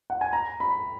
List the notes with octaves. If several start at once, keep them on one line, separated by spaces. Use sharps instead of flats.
F#5
G#5
A#5
B5